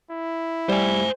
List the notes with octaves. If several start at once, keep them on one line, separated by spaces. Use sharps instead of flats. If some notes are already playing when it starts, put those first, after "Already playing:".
E4
G3 C5 G#5